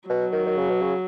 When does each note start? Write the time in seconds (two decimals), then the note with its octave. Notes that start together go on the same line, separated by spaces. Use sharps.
0.09 B2 F#3
0.33 D#3
0.46 D#3
0.58 C#3
0.70 B2
0.81 C#3